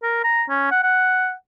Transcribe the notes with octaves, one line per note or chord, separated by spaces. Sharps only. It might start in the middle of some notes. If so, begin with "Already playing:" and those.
A#4
A#5
C#4
F#5
F#5